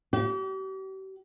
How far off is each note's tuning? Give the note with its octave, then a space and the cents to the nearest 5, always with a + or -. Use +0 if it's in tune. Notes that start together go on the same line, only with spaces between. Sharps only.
G4 -40